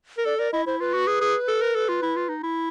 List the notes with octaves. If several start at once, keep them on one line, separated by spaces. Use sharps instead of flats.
A#4
A4 D5
A#4 D5
E4 D#5
E4 C5
F4 B4
F#4
G#4
G#4
A4
A#4
A4
F4
E4
F4
D#4
E4